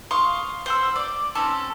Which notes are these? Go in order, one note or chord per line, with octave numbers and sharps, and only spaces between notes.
F5 C6 C#6 D#6
C5 F#5 E6
D5
C4 C#4 A4